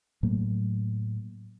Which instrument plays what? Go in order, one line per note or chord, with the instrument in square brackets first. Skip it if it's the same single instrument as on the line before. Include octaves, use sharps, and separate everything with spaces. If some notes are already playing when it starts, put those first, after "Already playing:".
[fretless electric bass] A2 F#3 A3 A#3